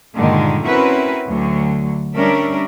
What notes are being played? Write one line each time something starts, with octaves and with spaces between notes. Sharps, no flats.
G2 A#2 D3 D#3 G#3
C4 C#4 E4 F#4 A#4 B4
D2 D3 F#3
G3 C#4 D4 A#4 E5